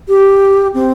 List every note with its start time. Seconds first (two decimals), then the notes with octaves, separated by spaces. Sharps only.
0.08 G4
0.74 C4